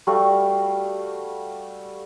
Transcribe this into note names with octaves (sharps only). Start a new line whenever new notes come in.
G3 A3 F#4 F5